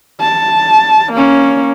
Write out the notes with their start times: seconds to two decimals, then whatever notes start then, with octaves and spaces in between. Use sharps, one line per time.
0.20 A5
1.12 A#3 C#4